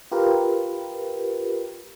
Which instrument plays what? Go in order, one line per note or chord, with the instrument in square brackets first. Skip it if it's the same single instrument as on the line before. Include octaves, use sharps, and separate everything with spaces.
[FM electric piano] F4 G4 A#4 B4